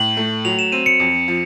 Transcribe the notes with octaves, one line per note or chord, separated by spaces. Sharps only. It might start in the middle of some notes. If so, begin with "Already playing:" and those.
Already playing: A2 F#7
A3
F#3 F7
E7
C4 D#7
C#7
F2
F3